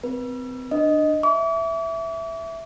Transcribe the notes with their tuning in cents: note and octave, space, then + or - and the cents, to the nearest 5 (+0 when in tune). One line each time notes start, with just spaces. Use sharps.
C4 -30 B4 -35
D4 +20 D#5 +0
E5 +0 D6 -45